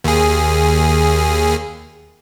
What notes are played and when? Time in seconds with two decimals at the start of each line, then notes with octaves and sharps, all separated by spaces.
0.04 D#2 G#4